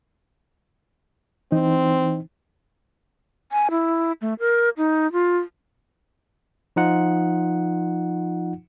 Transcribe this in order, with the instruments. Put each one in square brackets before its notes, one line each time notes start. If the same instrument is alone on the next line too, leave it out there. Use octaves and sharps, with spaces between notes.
[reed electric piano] E3 D#4 [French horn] C4
[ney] G#5
E4
A3
A#4
D#4
F4
[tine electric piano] F3 D#4 F4 F#5